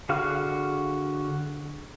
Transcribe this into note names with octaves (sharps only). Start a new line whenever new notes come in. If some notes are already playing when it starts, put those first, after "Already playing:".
D3 F#4 G#4 F5 F6